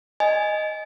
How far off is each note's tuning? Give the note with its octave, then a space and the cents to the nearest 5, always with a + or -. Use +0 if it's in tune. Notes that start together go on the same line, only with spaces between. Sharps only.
D#5 +0 G#5 +0